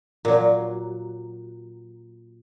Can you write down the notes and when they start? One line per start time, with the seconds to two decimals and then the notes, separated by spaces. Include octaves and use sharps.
0.25 A#2 F#3